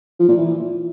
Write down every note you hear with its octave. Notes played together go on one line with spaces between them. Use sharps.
F3
A#2
E3